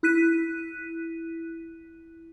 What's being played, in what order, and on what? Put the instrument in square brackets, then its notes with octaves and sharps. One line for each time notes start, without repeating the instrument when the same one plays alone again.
[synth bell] E4 F#6 B6 D#7